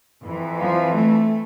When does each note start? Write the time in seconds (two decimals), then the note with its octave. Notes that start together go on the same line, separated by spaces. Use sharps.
0.21 F2 E3
0.60 F3
0.98 A3